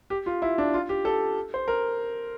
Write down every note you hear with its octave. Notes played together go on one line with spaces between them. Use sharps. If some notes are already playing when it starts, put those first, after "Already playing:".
G4
F4
E4
D4
F4
G4
A4
C5
A#4